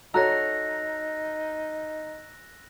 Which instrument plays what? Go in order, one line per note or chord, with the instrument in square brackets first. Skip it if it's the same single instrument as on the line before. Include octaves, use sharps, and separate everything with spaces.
[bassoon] D#4 [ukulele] F#4 A4 C#5 [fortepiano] A#5 [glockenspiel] E6 F#6 A#6